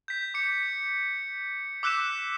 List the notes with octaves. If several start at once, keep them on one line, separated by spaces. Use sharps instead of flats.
G6 B6
D6 C#7
D6 E6 F#6 B6 E7